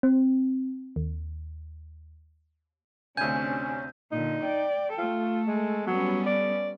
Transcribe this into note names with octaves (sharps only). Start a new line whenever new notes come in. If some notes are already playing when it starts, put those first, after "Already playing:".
C4
D#2
D2 C3 C#4 D4 G#5 G6
A#2 D3 D#4
D5 G5
A3 F4 A4
G#3
F#3 G3 B3 C#4
D5